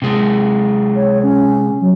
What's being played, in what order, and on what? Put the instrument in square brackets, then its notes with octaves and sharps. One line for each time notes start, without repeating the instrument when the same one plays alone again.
[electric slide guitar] C3 G#3
[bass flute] C#5
C#4
F#3